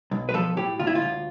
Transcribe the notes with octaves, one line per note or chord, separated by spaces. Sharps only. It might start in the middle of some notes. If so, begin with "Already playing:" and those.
B1
B4
F3 A4
A2 G4
D2 F4
E4
F4
D2